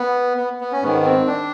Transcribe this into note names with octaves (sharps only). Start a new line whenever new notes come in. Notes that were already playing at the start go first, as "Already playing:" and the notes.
Already playing: B3
B3
B3
C#4
G#2 D#3 B3
C4
D4